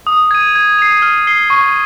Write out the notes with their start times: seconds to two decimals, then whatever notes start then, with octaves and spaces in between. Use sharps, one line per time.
0.07 D#6
0.31 G#6 D#7
0.55 G#6
0.78 C7 F7
1.02 F6
1.27 C7 G7
1.50 C#6